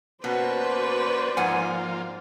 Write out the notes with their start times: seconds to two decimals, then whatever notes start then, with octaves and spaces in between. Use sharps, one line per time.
0.24 B2 A#3 C#4 F#4 B4 C5 D5
1.37 G#2 F3 A#3 F4 F#5 G#5